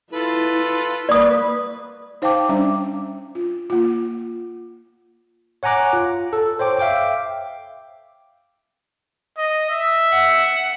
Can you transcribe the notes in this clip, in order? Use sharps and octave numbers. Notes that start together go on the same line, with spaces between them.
E4 F4 A4 B4
A#3 B4 D5 D#6
D#4 C5 F5 G5 A5 D6
G3 C#4 D4 C5 D5 D6
F4
A#3 F4
C#5 F#5 G#5 A#5 D6 F#6
F4
A4
C5 C#5 G5 D6
E5 F5 G5 D6
D#5
E5
F#5